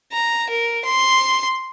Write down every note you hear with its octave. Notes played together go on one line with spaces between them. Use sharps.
A#5
A#4
C6